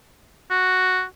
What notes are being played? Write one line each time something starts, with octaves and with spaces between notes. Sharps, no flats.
F#4